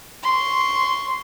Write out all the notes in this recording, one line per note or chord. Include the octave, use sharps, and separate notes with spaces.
C6 C#6